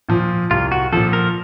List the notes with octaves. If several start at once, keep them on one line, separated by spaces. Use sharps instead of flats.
A#2 F3
C2 F4
F#4
A#2 F3 A4
A#4